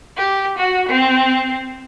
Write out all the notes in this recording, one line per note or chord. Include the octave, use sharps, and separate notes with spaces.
G4
F#4
C4